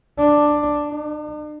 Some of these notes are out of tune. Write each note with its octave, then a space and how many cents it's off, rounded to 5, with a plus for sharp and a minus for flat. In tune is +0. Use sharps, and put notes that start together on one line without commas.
D4 +5
D4 +45